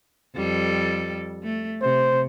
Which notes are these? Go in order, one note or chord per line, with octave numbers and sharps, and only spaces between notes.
F2 G3 A4
A3
C3 C5